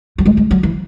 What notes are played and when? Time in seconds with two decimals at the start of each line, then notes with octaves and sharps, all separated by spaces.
0.18 F#3
0.26 G#3
0.37 G#3
0.51 F#3
0.63 E3